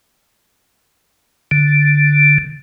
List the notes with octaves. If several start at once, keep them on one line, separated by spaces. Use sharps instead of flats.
D3